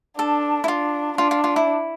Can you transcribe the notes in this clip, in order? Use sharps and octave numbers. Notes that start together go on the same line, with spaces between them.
D4 A4
E4
D4 F4
D4 F4
F4
F4
E4